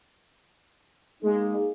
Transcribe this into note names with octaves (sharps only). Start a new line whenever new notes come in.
G#3 A#3 D#4 G#4